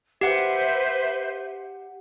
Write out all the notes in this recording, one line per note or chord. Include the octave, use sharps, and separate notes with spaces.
G4 B4 C5 E5 F#5